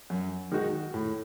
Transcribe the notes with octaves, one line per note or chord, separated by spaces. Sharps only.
F#2
D#3 G#3 D#4 F#4
A2